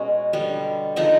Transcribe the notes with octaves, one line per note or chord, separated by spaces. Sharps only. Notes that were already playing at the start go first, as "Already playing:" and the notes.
Already playing: B2 G#3 B3 C#4
D3 G3 B3
D3 F3 G#3 B3 D#4